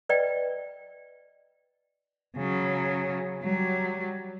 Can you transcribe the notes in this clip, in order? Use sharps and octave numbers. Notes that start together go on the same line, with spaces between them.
B4 D5 D#5 G5
C#3 F#3
F#3 G3